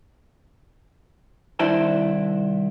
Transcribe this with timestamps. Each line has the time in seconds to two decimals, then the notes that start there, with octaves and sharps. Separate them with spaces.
1.59 C2 D#3 D4 E4 C5 A5